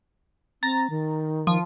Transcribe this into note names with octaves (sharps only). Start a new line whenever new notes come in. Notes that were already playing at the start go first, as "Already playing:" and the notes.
C4 A#5 A6
D#3
F3